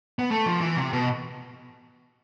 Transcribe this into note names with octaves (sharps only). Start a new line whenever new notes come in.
B3
A3
F3
E3
C3
B2